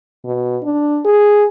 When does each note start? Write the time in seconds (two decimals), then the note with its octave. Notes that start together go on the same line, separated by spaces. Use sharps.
0.25 B2
0.63 D4
1.05 G#4